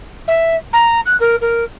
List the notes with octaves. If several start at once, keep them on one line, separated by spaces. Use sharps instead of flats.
E5
A#5
F#6
A#4
A#4